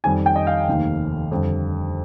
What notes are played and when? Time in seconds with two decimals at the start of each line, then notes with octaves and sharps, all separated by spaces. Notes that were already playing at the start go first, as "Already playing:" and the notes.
0.04 F2 D#3 G3 G#5
0.26 G5
0.36 D#5
0.47 F5
0.68 F1 D#2 D#3
1.32 F2 D3 G3